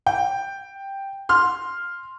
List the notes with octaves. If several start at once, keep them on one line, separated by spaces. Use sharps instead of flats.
G5
C6 F6